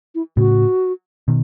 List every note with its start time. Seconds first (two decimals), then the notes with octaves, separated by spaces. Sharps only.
0.15 E4
0.37 A2 C#3 F#4
1.28 B2 D#3